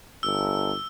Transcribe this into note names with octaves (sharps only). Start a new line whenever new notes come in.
G1 E6